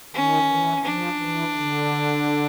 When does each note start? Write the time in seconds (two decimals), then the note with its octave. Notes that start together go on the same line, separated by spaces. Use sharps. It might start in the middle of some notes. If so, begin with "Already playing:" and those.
0.14 D#3 C#4
0.49 E3
0.84 F3 D4
1.19 E3
1.55 D3